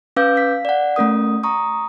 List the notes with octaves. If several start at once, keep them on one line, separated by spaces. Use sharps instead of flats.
C#4 B4 F5 D6 E6 G6
F5 B6
D5 F#5
A3 C#4 A#4 D#6
A#5 C#6 D#6